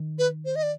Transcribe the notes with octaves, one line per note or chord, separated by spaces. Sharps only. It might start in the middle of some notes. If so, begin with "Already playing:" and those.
Already playing: D#3
B4
C5
D#5
D5